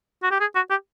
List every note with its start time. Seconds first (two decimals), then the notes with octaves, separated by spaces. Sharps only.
0.23 F#4
0.31 G4
0.40 G#4
0.55 F#4
0.70 G4